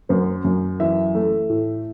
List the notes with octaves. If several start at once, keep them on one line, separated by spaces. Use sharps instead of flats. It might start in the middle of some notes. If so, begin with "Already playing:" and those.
F#2 C5
F#2
E3 E5
A3
A2